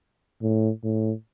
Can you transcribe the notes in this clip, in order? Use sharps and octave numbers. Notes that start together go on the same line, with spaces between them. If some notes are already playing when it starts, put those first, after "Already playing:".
A2
A2